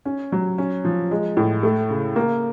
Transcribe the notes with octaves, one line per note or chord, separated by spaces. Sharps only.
C#4
F#3
C#4
F3
G#3
A2
A3
C#3
A#3